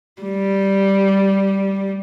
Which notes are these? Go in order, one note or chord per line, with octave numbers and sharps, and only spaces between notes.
G3